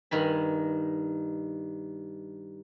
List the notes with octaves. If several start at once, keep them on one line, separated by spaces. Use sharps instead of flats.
G2 D#3 G#5 B5